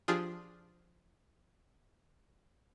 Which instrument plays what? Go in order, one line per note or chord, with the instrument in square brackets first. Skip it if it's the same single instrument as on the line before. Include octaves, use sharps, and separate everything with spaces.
[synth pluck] F3 D4 F4 G4 G#4